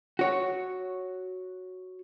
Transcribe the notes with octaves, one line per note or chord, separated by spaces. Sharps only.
F#4 C#5